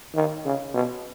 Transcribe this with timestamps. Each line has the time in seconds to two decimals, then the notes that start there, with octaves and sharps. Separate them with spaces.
0.15 D#3
0.45 C#3
0.74 B2